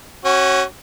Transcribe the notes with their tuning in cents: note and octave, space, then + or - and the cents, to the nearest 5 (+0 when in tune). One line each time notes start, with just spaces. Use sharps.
C#4 -15 F#4 +20